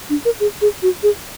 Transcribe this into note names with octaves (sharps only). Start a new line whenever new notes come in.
D4
A#4
G#4
G#4
F#4
G#4